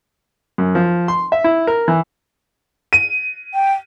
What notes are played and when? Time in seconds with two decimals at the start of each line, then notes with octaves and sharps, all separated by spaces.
0.58 F#2
0.75 F3
1.08 C6
1.32 E5
1.44 E4
1.67 A#4
1.88 E3
2.93 D#7
3.54 G5